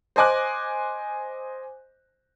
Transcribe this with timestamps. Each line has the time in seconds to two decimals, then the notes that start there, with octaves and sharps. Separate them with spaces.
0.16 C5 D#5 G#5 D6 F#6